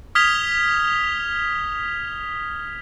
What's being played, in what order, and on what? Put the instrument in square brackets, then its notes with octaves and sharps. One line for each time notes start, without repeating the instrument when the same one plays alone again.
[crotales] D#6 F6 G#6 B6 F7 G7